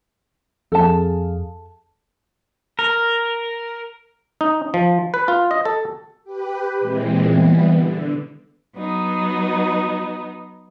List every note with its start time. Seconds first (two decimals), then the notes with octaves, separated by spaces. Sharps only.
0.72 F2 G#4 A4 F5 A5
2.79 A#4
4.41 D#4
4.74 F3
5.14 B4
5.28 F4
5.51 D#5
5.65 A4
6.24 G4 B4
6.80 A#2 E3 G#3 C4
7.28 E3 G3 B3
7.69 D3
8.76 F#3 B3 D#4